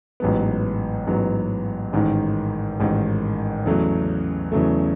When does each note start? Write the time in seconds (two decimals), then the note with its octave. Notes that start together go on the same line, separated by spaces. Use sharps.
0.20 A1 G#2 F#3 B3
1.07 A1 G#2 F#3 B3
1.93 A1 G#2 D#3
2.80 A1 G#2 D#3
3.65 E2 C#3 F#3 A3
4.52 E2 C#3 F#3 A3